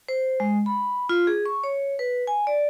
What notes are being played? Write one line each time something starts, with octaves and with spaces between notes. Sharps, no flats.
C5
G#3
B5
F4
G#4
C#6
C#5
B4
G#5
D5